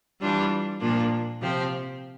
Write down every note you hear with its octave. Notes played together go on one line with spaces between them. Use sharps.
E3 G3 D4 F4
A#2 F3 A#3 D4 F4
C3 F3 C4 G4